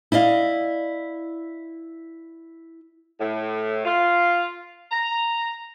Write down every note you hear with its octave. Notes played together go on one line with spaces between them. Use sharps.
E4 D5 D#5 F5
A2
F4
A#5